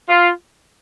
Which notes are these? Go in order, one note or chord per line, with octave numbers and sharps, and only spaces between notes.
F4